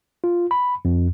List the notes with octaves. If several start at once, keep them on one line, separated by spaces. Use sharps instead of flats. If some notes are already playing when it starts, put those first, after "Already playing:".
F4
B5
F2